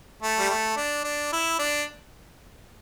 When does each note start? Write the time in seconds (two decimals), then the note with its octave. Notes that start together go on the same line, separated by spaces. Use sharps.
0.22 A3
0.39 G3
0.49 A3
0.76 D4
1.04 D4
1.32 E4
1.59 D4